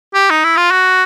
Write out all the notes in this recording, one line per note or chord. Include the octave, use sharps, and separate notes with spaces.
G4
D#4
E4
F4
F#4